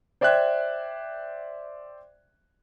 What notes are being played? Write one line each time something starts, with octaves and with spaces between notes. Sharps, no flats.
C5 D5 E5 G5 F#6 G#6